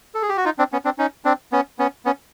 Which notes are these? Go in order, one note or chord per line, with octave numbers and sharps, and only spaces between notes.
A4
G#4
G4
F#4
D#4 F4
C4 D4
B3 C#4
C4 D4
C#4 D#4
C4 D4
B3 C#4
B3 C#4
B3 C#4